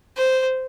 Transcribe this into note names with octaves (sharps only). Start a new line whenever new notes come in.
C5